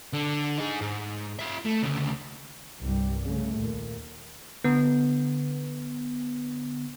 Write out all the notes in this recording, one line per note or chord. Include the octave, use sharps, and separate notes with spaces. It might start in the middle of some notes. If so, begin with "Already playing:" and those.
D3
D#4 G#4
G#2
F4 E5
A3
D2 C#3
C2 G2 G3
C#3 A3
D#2 A#2
D3 B3